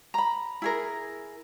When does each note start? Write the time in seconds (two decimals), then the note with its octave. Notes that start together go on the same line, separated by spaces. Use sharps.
0.14 A#5 B5
0.62 E4 G#4 A#4